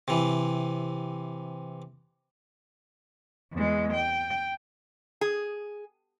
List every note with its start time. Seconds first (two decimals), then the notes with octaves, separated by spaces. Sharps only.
0.08 C3 E3
3.53 E2 G#3
3.93 G5
5.21 G#4